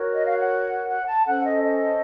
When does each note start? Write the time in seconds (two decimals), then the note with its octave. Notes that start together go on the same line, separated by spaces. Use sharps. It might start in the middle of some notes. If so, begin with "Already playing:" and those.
Already playing: F#4 A#4 C#5
0.13 D#5
0.26 F5
0.38 F#5
0.88 F#5
1.07 A5
1.26 C#4 A4 C5 F#5
1.44 D#5
1.63 D#5